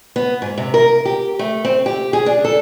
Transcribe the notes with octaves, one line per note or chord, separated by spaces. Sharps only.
B3
G#2
C3
A#4
G4
A3
C4
G4
G#4
D4
A4